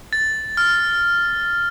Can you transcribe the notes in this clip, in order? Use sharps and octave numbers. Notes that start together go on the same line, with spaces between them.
A6
F6